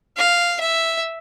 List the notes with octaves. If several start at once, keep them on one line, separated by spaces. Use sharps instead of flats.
F5
E5